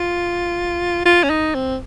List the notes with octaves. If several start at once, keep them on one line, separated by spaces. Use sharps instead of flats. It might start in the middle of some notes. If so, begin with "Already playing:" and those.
Already playing: F4
F4
C#4
D#4
C4